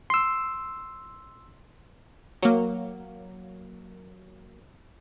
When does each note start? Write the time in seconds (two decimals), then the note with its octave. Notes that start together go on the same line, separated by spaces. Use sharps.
0.10 C6 E6
2.43 F#3 A#3